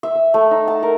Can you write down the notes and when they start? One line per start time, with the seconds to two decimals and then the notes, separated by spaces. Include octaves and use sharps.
0.03 E5
0.15 E5
0.34 A3
0.51 D#4
0.68 A5
0.83 A#4